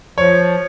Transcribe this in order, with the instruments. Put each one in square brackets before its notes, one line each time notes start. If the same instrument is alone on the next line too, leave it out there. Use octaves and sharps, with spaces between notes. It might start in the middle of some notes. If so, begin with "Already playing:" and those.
[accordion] F3 [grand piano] C#5